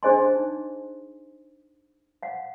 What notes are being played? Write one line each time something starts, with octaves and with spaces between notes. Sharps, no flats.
D4 G#4 C5 D#5 G#5 C6
D#4
F5 F#5